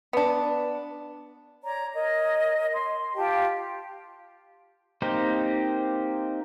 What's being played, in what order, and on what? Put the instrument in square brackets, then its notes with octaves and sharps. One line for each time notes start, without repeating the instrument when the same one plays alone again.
[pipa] B3 D4
[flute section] C#5 D5 A#5
A#4 C#5 D#5
C6
F4 G4 G5 A5
[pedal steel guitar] A#3 C4 D#4 G4 C5